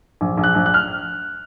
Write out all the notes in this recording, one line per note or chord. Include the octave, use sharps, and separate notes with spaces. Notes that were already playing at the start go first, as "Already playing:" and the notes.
A#1
A#1
F#6
A#1
F#6
F6